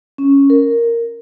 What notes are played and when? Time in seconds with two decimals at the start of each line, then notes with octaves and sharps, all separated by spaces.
0.18 C#4
0.50 A#4